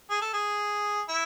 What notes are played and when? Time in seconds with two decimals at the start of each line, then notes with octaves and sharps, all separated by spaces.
0.10 G#4
0.22 A4
0.34 G#4
1.08 E4